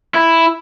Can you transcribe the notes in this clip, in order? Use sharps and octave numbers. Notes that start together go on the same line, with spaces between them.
E4